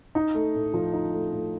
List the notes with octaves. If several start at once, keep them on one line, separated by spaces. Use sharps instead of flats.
D#4
A3
A2
F3
D#4
A3
A2